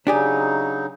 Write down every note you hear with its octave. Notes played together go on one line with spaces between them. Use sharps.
C#3 F#3 D4 D#4 G4 G#4